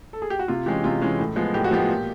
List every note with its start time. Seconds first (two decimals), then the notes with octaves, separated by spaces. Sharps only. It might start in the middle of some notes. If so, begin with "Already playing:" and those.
0.13 A4
0.22 G#4
0.30 G4
0.39 F#4
0.48 C3 F4
0.66 E3 G#3 C#4 G4
0.84 C3 F4
1.02 E3 G#3 C#4
1.18 A2
1.36 F3 G#3 B3
1.54 A2 G4
1.64 F#4
1.71 F3 G#3 B3 G4
1.89 A#2